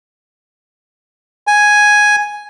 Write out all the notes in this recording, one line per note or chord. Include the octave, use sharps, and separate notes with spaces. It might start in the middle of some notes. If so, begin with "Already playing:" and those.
G#5